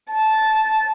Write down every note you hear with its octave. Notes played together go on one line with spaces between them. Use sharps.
A5